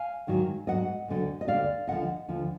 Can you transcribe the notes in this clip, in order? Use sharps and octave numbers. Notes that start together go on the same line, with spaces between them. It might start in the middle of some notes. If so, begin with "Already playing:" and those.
Already playing: F5 G#5
G#2 D#3 F#3
G#2 D#3 F#3 D#5 F#5
D2 D3 F#3
D#5
D2 D3 F#3 D5 F5
D2 D3 F3 D#5 F#5
D2 D3 F3